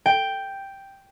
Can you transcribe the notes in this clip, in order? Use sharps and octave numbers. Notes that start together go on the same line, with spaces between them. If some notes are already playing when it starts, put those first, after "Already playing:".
G5